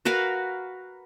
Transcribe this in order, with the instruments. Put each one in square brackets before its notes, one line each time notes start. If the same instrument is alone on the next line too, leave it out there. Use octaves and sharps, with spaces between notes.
[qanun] F#4 A#4 B4 F5